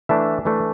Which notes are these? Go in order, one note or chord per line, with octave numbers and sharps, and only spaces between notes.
E3 A3 D4 E5
E3 A3 D4